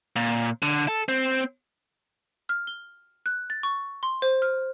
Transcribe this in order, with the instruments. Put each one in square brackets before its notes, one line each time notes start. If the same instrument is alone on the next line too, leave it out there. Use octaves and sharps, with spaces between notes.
[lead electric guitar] A#2
D3
A4
C4
[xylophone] F6
G7
F#6
A6
C#6
C6
C5
F6